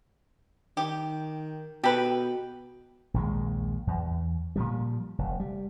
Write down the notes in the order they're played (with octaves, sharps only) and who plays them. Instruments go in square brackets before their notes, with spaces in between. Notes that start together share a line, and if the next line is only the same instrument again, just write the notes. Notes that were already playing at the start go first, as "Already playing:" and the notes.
[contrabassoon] D#3 [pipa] G4
[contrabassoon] B2 [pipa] G4 A4 B4
[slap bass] A#1 D#2 G#3
E2
A#2 F3 G3
F1
G3